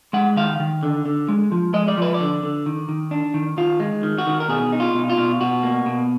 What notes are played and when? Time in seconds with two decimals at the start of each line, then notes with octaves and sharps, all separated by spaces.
0.13 G#3 F#5
0.36 D#3 F5
0.60 D#3
0.83 D3
1.06 D3
1.29 G#3
1.52 F3
1.74 G#3 D#5
1.88 D5
1.97 F3 B4
2.14 D5
2.20 D3
2.43 D3
2.66 D#3
2.89 D#3
3.11 D4
3.34 D#3
3.57 D#3 F4
3.80 G#3
4.03 D#3
4.18 F#4
4.27 D#3
4.40 A#4
4.49 B2 G#4
4.72 D#4
4.80 F4
4.95 B2
5.10 F4
5.18 B2
5.41 B2 F#4
5.63 A#3
5.86 B2